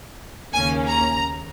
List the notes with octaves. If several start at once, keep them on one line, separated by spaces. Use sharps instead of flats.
D#2 C#3 A#3 C#4 G#5
A#5